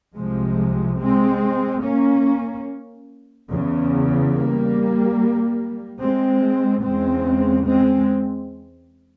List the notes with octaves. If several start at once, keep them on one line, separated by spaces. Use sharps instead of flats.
C2 C3 F3 G#3
G#3 C4
A#3 C#4
E2 C#3
G3 A#3
G#3 C4
E2 C#3 G#3 C4
G#3 C4